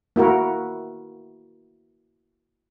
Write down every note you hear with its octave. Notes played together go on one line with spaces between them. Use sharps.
A#3 E4 F#4 A#4